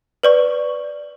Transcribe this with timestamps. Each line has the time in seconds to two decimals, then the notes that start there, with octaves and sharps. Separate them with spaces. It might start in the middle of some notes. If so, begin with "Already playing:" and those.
0.23 B4 D5 C#6